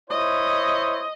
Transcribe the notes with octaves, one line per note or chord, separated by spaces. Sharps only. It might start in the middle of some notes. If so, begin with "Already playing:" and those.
E4 C5 C#5 D#5